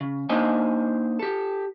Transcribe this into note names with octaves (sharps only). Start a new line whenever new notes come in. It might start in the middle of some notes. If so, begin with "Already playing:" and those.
C#3
A#3 D4 D#4 C5 D#5 G#5
G4 A4